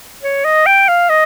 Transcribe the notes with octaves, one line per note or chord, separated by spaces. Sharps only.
C#5
D#5
G5
F5
D#5